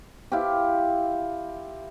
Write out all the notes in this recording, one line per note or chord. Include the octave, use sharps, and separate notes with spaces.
E4 F4 G4